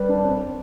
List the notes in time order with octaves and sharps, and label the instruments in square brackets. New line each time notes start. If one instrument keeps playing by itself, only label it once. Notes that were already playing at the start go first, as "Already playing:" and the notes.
Already playing: [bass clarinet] G3 [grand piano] B4
[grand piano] D4
C4